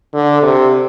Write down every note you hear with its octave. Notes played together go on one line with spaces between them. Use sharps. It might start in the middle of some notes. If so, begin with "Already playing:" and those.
D3
C3